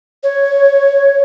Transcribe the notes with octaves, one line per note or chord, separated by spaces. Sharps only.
C#5